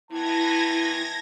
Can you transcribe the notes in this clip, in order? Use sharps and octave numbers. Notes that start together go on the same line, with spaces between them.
D#3 E3 B3 E4 A5 G#6 A#6